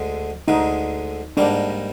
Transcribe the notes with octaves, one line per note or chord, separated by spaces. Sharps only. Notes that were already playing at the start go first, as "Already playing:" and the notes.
Already playing: D2 D3 G#3
D2 D3 G#3 D#4
G#2 G3 A#3 D4